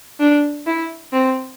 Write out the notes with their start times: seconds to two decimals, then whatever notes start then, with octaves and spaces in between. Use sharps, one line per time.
0.20 D4
0.67 E4
1.13 C4